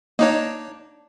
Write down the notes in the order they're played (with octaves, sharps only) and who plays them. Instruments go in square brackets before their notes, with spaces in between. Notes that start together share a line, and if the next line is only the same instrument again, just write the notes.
[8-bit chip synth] A#3 D#4 C#5 [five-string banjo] D4 D#5